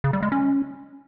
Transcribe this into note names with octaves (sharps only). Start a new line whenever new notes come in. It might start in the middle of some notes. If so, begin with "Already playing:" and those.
C#3
G3
G#3
C#4